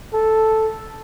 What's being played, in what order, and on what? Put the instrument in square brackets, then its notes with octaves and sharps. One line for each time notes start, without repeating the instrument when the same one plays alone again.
[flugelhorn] A4